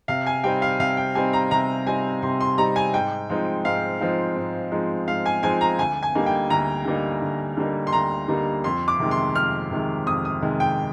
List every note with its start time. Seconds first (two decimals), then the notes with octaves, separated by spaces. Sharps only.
0.08 C3 F5
0.27 G#5
0.44 G3 C4 D#4 G5
0.62 F5
0.79 C3 F5
0.97 G5
1.15 G3 C4 D#4 G#5
1.33 A#5
1.51 C3 A#5
1.86 G3 C4 D#4 G#5
2.22 C3 C6
2.41 C6
2.58 G3 C4 D#4 A#5
2.76 G#5
2.93 G#2 G5
3.29 F3 G#3 C4 D#4
3.65 G#2 F5
4.00 F3 G#3 C4 D#4
4.36 G#2
4.72 F3 G#3 C4 D#4
5.07 G#2 F5
5.26 G#5
5.43 F3 G#3 C4 D#4 G#5
5.61 A#5
5.79 D2 G#5
6.03 G#5
6.15 D3 G3 A#3 D#4
6.26 G5
6.50 D2 A#5
6.85 D3 G3 A#3 D#4
7.22 D2
7.57 D3 G3 A#3 D#4
7.87 C6
7.93 D2 A#5
8.28 D3 G3 A#3 D#4
8.64 F2 C6
8.88 D6
8.99 C3 D#3 G#3
9.11 C6
9.35 F2 F6
9.71 C3 D#3 G#3
10.06 F2 D#6
10.25 D#6
10.42 C3 D#3 G#3
10.60 G5